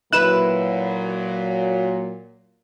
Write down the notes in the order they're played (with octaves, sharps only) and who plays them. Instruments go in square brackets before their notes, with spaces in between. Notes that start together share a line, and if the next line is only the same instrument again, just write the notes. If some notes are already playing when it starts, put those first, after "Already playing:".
[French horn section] A#2 F#3 [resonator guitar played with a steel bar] E4 B4 [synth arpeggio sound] F#6 E7